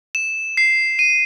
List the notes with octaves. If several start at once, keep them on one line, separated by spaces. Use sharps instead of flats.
E7
C7
D#7